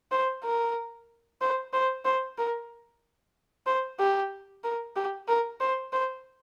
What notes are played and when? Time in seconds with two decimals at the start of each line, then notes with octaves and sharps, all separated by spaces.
0.12 C5
0.44 A#4
1.41 C5
1.73 C5
2.05 C5
2.38 A#4
3.67 C5
4.00 G4
4.64 A#4
4.97 G4
5.28 A#4
5.60 C5
5.93 C5